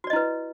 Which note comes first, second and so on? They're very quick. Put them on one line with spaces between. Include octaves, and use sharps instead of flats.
F#4 D5 D#5 E4 B4